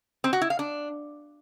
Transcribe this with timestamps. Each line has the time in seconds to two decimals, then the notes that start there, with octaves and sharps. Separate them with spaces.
0.24 C4
0.33 F#4
0.41 E4
0.50 F5
0.59 D4